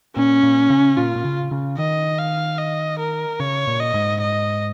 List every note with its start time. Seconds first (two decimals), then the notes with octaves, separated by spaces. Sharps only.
0.16 A#2 C#4
0.43 A#2
0.70 C#3
0.97 A#2 F4
1.16 A#2
1.25 C#3
1.51 C#3
1.78 D#3 D#5
2.19 F5
2.58 D#5
2.99 A#4
3.40 C#3 C#5
3.67 A#2
3.80 D#5
3.94 G#2
4.21 D#5